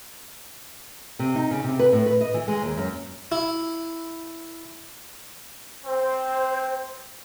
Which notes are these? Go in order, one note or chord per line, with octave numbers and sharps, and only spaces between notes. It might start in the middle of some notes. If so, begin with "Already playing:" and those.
C3
D#4
C#3
C3
B4
A2
B4
D#5
E3
G#3
D#2
F#2
E4
C4 C5